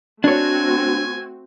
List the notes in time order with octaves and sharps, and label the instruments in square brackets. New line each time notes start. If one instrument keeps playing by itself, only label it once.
[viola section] A3 C4 F#4 [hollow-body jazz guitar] D4 C#5 [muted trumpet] G#5